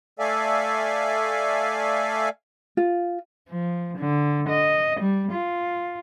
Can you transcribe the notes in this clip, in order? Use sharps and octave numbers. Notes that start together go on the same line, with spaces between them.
A3 A4 D5 E5 F5 G#5
F4
F3
D3
D#5
G3
F4